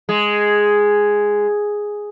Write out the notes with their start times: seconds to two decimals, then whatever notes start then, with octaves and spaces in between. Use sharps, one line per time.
0.09 G#3